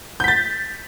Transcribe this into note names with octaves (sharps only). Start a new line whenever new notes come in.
G6 A6 B6